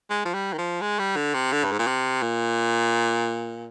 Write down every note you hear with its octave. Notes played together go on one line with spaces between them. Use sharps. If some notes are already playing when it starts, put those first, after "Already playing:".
G#3
F3
G3
D#3
F3
G#3
G3
D3
C3
D3
G2
G#2
A#2
C3
A#2